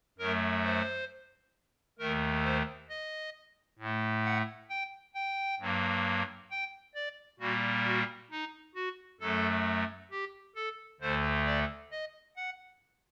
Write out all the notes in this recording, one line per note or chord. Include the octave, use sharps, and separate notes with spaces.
F#2 F#3 A3 A#4
C5
D#2 D#3 A3 A#4
C5
D#5
A2 A3
F#5
G5
G5
G2 F#3 A#3
G5
D5
A#2 G3 A#3 F#4
F#4
D#4
F#4
F#2 F#3 A3 A4
G4
A4
D2 D3 A3 C5
D5
D#5
F#5